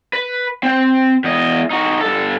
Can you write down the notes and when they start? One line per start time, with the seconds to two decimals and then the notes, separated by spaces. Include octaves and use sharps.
0.13 B4
0.63 C4 G5
1.24 E2 D#5
1.71 D#4 F#4
2.01 G2 A4